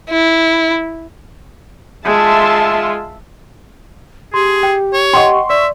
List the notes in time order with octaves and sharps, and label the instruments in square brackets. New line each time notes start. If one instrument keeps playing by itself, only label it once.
[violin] E4
[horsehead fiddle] G#3 F4 [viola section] E5 A5 C6
[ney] G4 [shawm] G#4 [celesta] C6
[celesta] G5
[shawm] C#5
[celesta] D#5 F#5 G5 [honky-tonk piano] C6 C#6
[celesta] D5 [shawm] E5